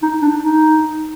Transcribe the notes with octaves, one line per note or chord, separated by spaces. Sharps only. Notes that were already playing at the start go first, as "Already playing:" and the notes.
D#4
D4
D#4